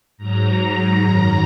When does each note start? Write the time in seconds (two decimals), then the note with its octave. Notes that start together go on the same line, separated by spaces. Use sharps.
0.17 G#2 F#3 A#5
0.98 F#2 D#3 F#3